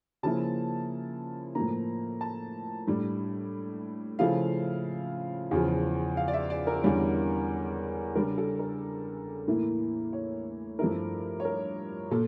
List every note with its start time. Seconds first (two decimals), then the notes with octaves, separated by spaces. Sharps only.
0.23 C#3 F3 A#3 E4 A5
1.55 A2 F3 A#3 A#5
2.21 A5
2.87 A2 G3 D4
4.19 C#3 F3 A3 E4 F5
5.51 E2 C#3 F3
6.17 F5
6.28 D5
6.33 E5
6.50 D5
6.67 A#4
6.83 E2 D3 G3 C#4
8.15 C#3 G3 D4 A#4
8.38 A4
8.59 A#4
9.47 A2 E3 A#3 E4
10.13 C#5
10.79 G2 F3 A3 E4 A#4
11.40 C#5
11.45 A#4
12.11 A#2 A4